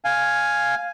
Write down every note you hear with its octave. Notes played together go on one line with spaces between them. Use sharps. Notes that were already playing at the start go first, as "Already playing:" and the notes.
F5 G#5